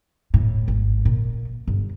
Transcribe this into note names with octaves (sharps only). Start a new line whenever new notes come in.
A2
G#1
A#2
G1